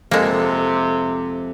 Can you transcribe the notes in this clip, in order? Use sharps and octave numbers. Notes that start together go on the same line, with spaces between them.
F2 C3 G#3 A#3 A4